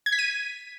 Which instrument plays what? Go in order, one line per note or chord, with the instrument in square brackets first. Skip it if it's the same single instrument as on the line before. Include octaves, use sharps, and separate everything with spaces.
[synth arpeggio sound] G#6
B6
D#7